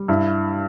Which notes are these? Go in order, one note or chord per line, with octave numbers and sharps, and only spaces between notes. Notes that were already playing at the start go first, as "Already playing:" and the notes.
Already playing: G3
G2 E4